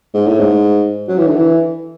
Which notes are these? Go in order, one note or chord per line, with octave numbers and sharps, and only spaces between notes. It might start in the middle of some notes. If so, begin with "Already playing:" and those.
G#2
A2
G#2
F#3
E3
D3
E3